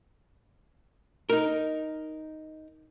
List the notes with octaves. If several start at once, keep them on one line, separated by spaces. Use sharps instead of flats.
D#4 A#4